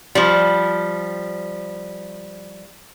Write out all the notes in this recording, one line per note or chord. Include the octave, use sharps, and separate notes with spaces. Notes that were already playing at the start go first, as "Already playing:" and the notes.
F3 G3